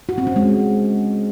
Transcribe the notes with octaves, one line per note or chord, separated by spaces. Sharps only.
F#4
C4
C#4
G#3